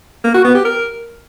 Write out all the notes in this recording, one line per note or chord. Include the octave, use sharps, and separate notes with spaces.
A#3
F#4
B3
G4
A#4